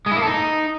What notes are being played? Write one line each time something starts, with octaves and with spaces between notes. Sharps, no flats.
G#3
E4
A#3
A4
D#4